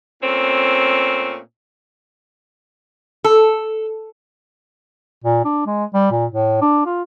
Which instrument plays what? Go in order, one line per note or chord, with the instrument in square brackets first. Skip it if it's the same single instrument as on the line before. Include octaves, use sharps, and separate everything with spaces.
[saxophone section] A#2 A3 C4 C#4
[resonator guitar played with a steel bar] A4
[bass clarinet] A#2
D4
G#3
G3
A#2
A2
D4
F4